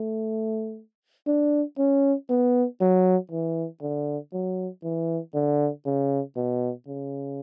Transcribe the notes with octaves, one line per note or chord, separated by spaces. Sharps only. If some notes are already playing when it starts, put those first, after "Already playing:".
Already playing: A3
D4
C#4
B3
F#3
E3
D3
F#3
E3
D3
C#3
B2
C#3